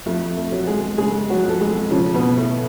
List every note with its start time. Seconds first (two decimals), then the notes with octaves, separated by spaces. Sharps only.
0.06 F2 A3
0.37 A3
0.52 F#3
0.67 G#3 G#4
0.98 C#3 G#3 G#4
1.30 F#3 F#4
1.45 F2 A4
1.60 G#3 G#4
1.91 C#3 F3 C#4
2.14 B2 B3
2.37 A2 A3